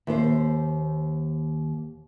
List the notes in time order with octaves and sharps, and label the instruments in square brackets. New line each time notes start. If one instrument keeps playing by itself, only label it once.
[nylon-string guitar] D#2 C5